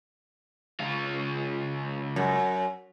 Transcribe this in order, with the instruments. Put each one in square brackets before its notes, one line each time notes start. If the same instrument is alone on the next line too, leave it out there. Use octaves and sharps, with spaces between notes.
[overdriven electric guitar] C#2 F4
[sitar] F#2